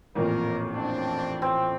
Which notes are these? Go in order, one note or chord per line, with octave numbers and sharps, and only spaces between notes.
A1 F2 A#2 A#4
C4 D4
C4